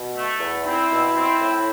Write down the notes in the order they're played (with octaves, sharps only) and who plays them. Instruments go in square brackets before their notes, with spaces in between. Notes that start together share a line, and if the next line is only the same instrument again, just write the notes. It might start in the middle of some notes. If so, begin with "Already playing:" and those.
Already playing: [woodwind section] B2
A3
E2
[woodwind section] C4 [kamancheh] E4
[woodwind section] B2
C4
A2